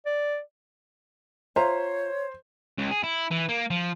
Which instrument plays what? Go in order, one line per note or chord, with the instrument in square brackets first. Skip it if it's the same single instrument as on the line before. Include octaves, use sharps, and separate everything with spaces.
[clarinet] D5
[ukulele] F4 E5 A#5 [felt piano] C5 [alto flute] C#5
[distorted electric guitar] C#2
G#4
E4
E3
A#3
F3